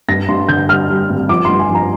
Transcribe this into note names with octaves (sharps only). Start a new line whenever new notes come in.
G2 A#6
G2 C6
D3 G6
G3 F6
G3
G#1
F3 D6
G2 C6
G#5
F3
A#5